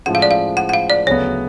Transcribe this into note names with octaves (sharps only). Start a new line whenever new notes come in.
A2 F3 G#3 C#4 F#5
F5
D5
F5
F#5
F#5
F5
D5
D2 C#3 F#3 B3 C#5